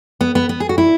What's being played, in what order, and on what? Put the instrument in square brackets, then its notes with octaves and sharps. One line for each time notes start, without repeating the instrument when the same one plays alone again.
[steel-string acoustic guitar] B3
B3
B3
G#4
F#4
E4